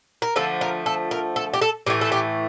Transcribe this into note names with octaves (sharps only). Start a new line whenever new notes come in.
A#4
D3 F3 A3 A4
A#4
A4
A#4
A4
G4
A4
A2 E3 A3 G4
A4
G4